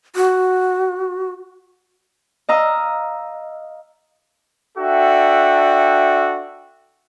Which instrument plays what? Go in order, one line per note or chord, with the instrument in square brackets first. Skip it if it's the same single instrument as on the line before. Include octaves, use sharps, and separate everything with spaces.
[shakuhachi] F#4
[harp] D#5 F5 A#5 E6
[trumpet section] D4 F#4 A4 E5 G5